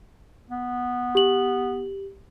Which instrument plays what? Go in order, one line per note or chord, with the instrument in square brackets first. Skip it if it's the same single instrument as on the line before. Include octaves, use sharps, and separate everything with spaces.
[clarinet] B3
[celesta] G4 F#7